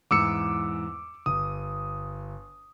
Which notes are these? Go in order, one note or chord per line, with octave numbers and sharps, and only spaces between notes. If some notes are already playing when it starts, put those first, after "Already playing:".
E2 G#2 E3 D6 E6 C#7
G1 D#6